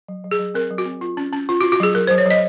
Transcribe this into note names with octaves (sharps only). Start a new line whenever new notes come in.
F#3
F#3
G#4
F#3
C4 A#4
F#3
F#4
C4
F4
C#4
C#4
F4
F#4
F4
F#4
F#3 G#4
F#3 A#4
F#3 C5
C#5
F#3 D#5